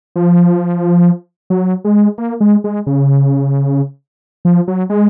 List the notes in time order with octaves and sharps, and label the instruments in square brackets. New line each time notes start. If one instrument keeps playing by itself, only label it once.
[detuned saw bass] F3
F#3
G#3
A#3
G#3
G#3
C#3
F3
F#3
G#3